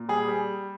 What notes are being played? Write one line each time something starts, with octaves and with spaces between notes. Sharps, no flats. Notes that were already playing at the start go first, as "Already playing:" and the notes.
Already playing: A#2
G3 G#4
G3